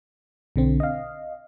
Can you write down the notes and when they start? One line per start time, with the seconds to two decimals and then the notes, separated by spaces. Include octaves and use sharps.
0.56 B1 D3 C4
0.80 D#5 F5